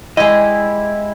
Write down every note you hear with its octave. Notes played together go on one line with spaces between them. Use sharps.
G#3 E4 G4 D5 D#5 G#5